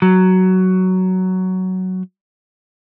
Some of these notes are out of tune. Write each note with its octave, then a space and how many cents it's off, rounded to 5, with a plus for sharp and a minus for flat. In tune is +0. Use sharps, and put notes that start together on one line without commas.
F#3 +10